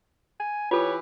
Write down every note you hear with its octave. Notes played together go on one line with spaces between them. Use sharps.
G#5
E3 F4 G4 A4 B4 C#5